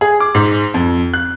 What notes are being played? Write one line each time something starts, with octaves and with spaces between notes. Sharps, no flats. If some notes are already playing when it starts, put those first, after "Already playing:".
G#4
D6
G#2
F2
F#6